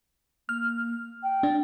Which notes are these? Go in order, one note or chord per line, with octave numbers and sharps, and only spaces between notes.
A#3 F6
G5
D4